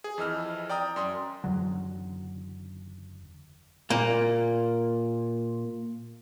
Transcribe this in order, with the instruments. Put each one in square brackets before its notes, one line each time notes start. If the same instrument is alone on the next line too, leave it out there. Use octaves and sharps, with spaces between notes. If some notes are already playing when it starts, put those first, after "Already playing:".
[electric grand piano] G#4
F2 E3 D#5 E6 F6
D5 G5 A#5 D#6
F#2 C6 D#6
[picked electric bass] F#1 E2 D3 F#3
[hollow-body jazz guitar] A#2 A#3